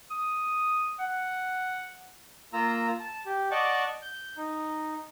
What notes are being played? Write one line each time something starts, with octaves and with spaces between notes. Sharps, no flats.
D#6
F#5
A#3 F4 A#5 E6
A5
G4
D5 D#5 F#5 A5 C#6 D6
G6
D#4